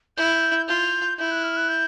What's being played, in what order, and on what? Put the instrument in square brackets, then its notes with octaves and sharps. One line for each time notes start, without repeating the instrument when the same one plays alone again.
[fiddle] E4 [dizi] G6
[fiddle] F4 [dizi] G6
[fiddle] E4 [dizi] G6
[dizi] F#6
F6
F#6
G6